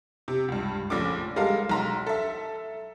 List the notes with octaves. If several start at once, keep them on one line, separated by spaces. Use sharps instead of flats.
C3
C#2 G2
A#1 C#3 A3 D6
G3 G#3 A4 A#4 F5
B1 A#5 C6
A4 E5